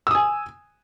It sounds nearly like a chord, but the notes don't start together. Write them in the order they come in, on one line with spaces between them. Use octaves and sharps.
E6 D#6 G#5